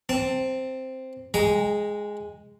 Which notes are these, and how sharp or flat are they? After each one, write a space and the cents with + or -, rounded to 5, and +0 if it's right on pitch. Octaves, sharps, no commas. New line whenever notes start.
C4 +0 A5 +20
G#3 +0 G5 +40 A#5 +0